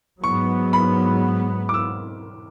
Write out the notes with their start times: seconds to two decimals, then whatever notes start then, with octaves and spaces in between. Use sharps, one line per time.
0.23 G#2 F#3 B3 C#6
0.73 B5
1.69 D6
1.74 E6